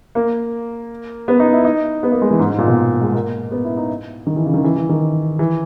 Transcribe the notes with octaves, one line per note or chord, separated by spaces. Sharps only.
A#3
B3
D#4
E4
D#4
B3
A#3
G#3
E3
G#2
G#2
A#2
B2
G#3
A#3
B3
E4
D#4
D#3
E3
C#3
D#3
E3
E3
D#3
E3